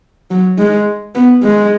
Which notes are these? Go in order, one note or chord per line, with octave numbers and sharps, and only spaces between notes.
F#3
G#3
B3
G#3